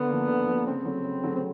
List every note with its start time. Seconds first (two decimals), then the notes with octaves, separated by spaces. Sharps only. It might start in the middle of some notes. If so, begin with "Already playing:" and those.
Already playing: D3 B3
0.09 F3 A#3
0.28 D3
0.47 F3 A#3
0.66 C#3 C4
0.85 F#3 A3
1.04 C#3
1.24 F#3 A3
1.36 C4